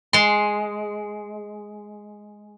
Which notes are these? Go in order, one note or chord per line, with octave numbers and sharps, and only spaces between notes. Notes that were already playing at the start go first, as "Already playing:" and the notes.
G#3 C6